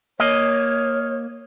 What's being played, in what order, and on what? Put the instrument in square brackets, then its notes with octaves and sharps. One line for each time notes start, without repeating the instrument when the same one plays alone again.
[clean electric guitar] A#3 D#5 [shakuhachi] C#5